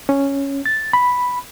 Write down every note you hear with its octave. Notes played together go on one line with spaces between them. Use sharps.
C#4
A6
B5